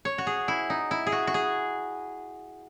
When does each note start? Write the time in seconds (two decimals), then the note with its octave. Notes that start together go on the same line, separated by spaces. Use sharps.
0.05 C#5
0.18 F#4
0.27 G#4
0.48 E4
0.70 D#4
0.91 E4
1.07 G#4
1.12 F#4
1.27 F#4
1.34 G#4